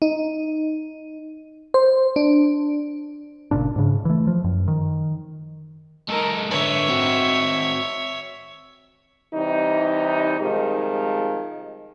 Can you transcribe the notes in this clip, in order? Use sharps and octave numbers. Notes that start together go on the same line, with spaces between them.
D#4
C5
D4
G1 A#2 C#3 D4
G#2 C#3
E3 A3
F3
F#2
D#3
G#3 D#4 A4 A#4
D3 B4 C#5 E5
C4 F#4
C3 E3 G3 D#4
C3 D#3 F3 G3 G#3